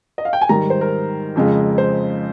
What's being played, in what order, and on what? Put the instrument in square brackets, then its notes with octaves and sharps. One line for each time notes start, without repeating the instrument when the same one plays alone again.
[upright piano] D#5
F5
G5
G#5
G#2 D#3 G3 A#5
C5
A#4
F2 C#3 G#3
C5